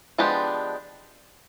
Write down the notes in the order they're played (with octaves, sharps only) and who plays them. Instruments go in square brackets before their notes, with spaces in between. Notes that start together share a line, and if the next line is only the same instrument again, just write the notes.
[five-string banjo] F3 G#3 B3 D4 G4